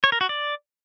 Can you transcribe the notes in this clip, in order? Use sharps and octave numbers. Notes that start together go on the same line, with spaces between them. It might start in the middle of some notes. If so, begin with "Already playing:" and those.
C#5
A#4
F#4
D5